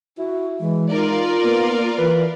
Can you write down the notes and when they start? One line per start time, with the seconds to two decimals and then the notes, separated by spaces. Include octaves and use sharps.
0.18 E4 F#4
0.60 E3 G#3
0.90 D#4 F4 A#4 D5
1.43 A#3 B3
1.98 E3 B4